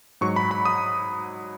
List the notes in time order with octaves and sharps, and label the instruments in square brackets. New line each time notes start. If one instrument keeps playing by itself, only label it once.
[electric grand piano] G#2 F#3 C#6
B5
B5
D#6